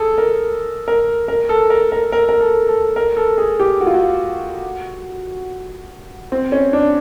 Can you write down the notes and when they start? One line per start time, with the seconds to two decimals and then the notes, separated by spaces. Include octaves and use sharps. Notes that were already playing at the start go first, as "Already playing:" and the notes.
Already playing: G#4 A4
0.18 A#4
0.88 A#4
1.28 A#4
1.49 A4
1.70 A#4
1.92 A#4
2.12 A#4
2.29 A#4
2.41 A4
2.68 A4
2.96 A#4
3.17 A4
3.38 G#4
3.60 G4
3.81 F#4
3.87 F4
3.94 F#4
6.32 C4
6.52 C#4
6.73 D4